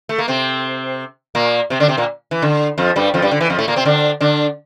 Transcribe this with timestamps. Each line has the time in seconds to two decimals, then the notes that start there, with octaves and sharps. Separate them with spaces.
0.09 A3
0.18 A#3
0.28 C3 C4
1.35 A#2 A#3
1.70 C3 C4
1.80 D3 D4
1.88 C3 C4
1.97 A#2 A#3
2.31 E3
2.42 D3
2.78 F2 F3
2.96 G2 G3
3.14 F2 F3
3.22 G2 G3
3.31 D3
3.41 E3
3.50 F2 F3
3.59 A2 A3
3.68 A#2 A#3
3.76 C3 C4
3.85 D3 D4
4.21 D3 D4